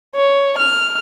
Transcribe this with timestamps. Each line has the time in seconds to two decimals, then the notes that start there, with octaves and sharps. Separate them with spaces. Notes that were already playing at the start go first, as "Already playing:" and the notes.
0.16 C#5
0.58 F6